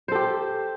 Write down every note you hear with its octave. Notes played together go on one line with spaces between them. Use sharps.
G4 A4 C5